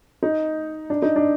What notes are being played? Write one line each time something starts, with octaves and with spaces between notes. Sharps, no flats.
D#4
D4
D#4
D4